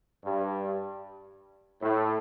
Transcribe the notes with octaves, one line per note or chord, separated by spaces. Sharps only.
G2
A2